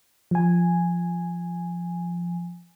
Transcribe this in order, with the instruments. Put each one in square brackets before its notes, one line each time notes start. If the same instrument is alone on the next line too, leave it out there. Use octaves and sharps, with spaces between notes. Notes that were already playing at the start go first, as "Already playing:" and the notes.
[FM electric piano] F3 G#5